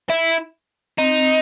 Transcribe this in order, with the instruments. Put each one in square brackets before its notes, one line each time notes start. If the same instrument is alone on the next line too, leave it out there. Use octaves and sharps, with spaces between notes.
[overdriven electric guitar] E4
[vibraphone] C4 [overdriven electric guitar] D#4
[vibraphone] C4